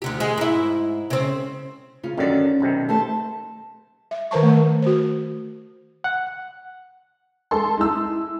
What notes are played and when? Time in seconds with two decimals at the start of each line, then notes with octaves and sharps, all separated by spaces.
0.02 D2 D3 G4
0.20 G#3 G#4
0.38 G#2 E4
1.10 C#3 C4
2.03 C#3 F4
2.17 F#2 D3 D#3 C#4 D5
2.60 B1 C3 D#3
2.89 A3 A4 C5 A5
4.11 E5
4.31 D#3 A#4 C5 A5 C#6
4.43 A3 C5
4.82 F#4 C5
6.04 F#5
7.51 G#3 A4 C6
7.77 G#3 E4 E6